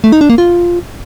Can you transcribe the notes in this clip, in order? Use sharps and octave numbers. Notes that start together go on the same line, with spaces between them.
A3
D#4
D4
A#3
F4